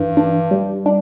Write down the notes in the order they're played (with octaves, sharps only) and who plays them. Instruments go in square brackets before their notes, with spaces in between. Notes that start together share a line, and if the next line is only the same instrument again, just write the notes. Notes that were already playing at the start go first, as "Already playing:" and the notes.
Already playing: [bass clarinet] G2 [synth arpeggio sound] E3
[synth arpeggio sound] D4
G3
D4